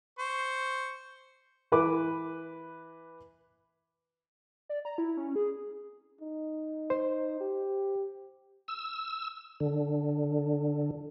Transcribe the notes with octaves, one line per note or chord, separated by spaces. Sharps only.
C5 C#6
E3 B4 D6
D5
A#5
E4
C#4
G#4
D#4
C5
G4
E6
D3